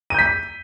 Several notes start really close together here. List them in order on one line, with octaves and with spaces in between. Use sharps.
D#7 G6 B6